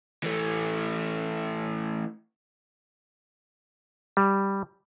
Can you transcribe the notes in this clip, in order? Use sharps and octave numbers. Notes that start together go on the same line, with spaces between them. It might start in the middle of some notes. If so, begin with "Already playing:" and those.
E3 A3
G3